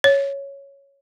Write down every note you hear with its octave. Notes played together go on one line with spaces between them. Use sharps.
C#5